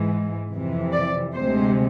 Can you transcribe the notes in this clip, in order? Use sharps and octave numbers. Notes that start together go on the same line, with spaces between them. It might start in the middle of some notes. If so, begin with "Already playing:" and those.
Already playing: G#2 E3 G#3
F2 C3 E3
D5
D2 C3 G#3 C5